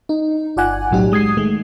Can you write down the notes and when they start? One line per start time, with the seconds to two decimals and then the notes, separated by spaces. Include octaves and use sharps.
0.09 D#4
0.56 G1 F4 D5 F#5 G#5 F#6
0.91 B1 A2 F#3 C#4 D#4 G4
1.12 G#3 D#6 G#6 C7
1.37 D#3 G#3 A3